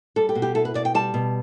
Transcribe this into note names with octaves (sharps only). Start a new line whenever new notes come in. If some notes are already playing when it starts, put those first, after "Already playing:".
G3 A4
G4
B2
G4
E4 A4
B4
B2 D5
G5
G3 A5
B2